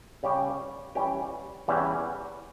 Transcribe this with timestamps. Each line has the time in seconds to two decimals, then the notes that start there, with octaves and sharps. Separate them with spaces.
0.23 C#3 G3 C#4 G4
0.95 E3 G3 C#4 G4
1.68 E2 E3 G3 C#4